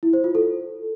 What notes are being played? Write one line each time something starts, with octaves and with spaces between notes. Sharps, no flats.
E4
C5
F4
A4